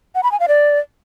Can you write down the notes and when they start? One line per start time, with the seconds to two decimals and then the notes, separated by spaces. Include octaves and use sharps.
0.15 F#5
0.23 B5
0.32 G#5
0.40 F5
0.48 D5